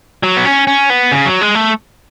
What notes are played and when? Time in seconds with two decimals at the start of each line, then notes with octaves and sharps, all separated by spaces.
0.23 F#3
0.37 B3
0.45 C#4
0.67 C#4
0.90 B3
1.12 C#3
1.25 F#3
1.41 G#3
1.55 A3